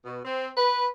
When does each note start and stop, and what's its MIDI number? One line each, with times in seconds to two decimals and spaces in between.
0.04 0.19 47
0.24 0.49 60
0.57 0.86 71